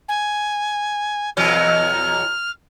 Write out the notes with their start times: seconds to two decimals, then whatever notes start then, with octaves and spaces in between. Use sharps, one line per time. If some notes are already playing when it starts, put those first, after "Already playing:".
0.09 G#5
1.37 E2 B2 F#3 F6